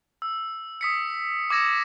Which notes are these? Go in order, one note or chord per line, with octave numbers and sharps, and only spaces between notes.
E6
D#6 B6 C#7
D6 E6 G#6 A#6 C#7 E7